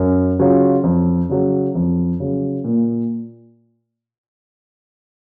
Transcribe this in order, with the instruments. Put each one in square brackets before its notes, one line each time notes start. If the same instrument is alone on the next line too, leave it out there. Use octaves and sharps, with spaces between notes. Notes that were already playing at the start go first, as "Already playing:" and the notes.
Already playing: [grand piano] F#2
C#3 F#3 C#4 F4
F2
C#3 F#3
F2
C#3 F#3
A#2